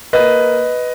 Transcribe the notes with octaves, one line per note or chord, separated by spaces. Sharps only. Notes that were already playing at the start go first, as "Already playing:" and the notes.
A#3 B4 D#5